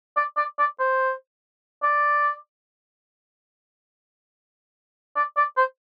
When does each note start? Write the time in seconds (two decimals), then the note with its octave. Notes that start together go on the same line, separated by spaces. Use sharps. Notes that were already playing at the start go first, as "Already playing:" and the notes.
0.17 D5
0.37 D5
0.59 D5
0.80 C5
1.83 D5
5.17 D5
5.37 D5
5.57 C5